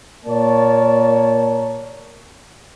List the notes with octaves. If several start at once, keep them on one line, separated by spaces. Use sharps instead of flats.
A#2 A#3 A#4 C#5 D5 A5